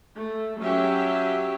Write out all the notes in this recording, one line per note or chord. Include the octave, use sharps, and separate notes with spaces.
A3
F#3 C#4 G4 C#5 E5